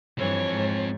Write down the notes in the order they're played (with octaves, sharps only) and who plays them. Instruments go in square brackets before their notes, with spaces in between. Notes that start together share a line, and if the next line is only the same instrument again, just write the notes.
[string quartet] G2 E3 [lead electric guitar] F3 C4 [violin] C#5
[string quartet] G#2